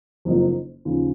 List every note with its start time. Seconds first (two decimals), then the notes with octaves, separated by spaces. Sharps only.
0.25 F#1 F2 D#3 A#3 D#4
0.85 D#2 C#3 F3